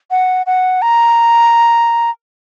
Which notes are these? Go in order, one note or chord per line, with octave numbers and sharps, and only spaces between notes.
F#5
F#5
A#5